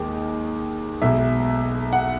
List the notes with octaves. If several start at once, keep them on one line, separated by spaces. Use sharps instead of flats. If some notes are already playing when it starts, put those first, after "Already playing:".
Already playing: D#2 D#3 G#3
B1 B2 G#3 E5
F#5